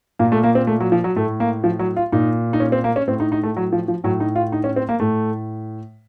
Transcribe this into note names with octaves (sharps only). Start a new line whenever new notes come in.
A#2 A#3
A3
A#3
C4
A3
F#3
F3
F#3
A2 A3
A#3
F3
F#3
F4
A#2 D#4
D#4
C#4
C4
A#3
C#4
A2 C4
D#4
D#4
A3
F#3
F3
F3
A2 F#3
D#4
F4
D#4
C#4
C4
A#3
A2 A3